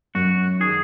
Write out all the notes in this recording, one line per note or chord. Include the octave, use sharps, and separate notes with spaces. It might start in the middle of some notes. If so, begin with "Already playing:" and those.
F#2 F#4
D#3 G#3 G#4